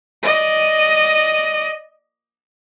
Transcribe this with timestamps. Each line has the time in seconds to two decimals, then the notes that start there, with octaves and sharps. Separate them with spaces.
0.23 D5 D#5